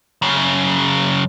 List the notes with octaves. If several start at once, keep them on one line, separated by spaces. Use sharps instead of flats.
F#2 C#3